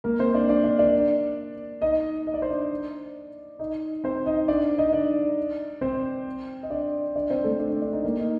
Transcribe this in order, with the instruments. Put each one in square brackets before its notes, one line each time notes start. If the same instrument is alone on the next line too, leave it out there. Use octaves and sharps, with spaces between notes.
[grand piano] A#3 A#4
C4 C5
D4 D5
D4 D5
D4 D5
D4 D5
D#4 D#5
D#5
D5
C5
D4 D5
D#4 D#5
C4 C5
D#4 D#5
D4 D5
D#4 D#5
D4 D5
C4 C5
D#5
D4 D5
D4 D5
C4 C5
A3 A4
D4
D4
D4
D#4
A#3 A#4
D#4